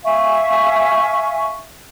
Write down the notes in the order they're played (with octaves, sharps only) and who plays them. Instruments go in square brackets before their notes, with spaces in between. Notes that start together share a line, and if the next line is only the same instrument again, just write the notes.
[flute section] E5 F5 G#5 C#6